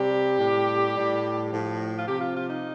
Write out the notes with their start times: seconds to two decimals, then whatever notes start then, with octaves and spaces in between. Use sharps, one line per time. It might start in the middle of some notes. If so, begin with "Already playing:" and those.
Already playing: C3 G3 G4
0.38 A2 G3
0.95 A2 G3
1.51 A2 F3
1.97 F4
2.07 C3 F3 G4
2.20 F4
2.34 F4
2.48 D#4